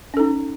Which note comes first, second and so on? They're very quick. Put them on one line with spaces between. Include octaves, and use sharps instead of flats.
C#4 A4 D#4